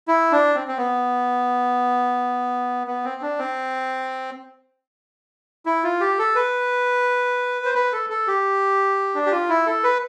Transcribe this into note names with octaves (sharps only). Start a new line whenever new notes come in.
E4
D4
C4
C4
B3
B3
C4
D4
C4
E4
F4
G4
A4
B4
C5
B4
A4
A4
G4
D4
G4
F4
E4
A4
B4